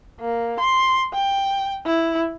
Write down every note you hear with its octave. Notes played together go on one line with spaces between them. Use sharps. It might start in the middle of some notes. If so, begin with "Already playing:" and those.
A#3
C6
G5
E4